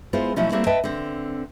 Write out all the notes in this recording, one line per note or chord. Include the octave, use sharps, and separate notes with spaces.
G#3 B3 E4 F4 C5
B2 F3 F#3 A3 C#4 E4
G3 A3 A#3 C4 E4
B4 D#5 E5 G5 A5
D3 C4